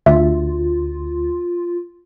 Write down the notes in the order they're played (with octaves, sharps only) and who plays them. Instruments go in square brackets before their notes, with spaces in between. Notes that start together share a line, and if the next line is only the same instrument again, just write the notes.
[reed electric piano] D2 [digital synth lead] F4 [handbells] E5